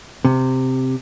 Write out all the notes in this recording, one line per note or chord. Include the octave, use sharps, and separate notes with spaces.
C3